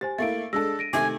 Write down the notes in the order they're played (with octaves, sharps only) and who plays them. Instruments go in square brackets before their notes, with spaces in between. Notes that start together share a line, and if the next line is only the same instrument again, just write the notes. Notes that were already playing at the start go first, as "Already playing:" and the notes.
[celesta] G4 C5 G#5 [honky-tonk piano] A6
[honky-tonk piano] A3 A#3 E4 [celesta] A6 D7
[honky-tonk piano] G#3 D4 A4 [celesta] E6 A#6
[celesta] A#6 D7 D#7
[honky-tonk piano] C3 D#3 A3 [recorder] G#5 [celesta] D6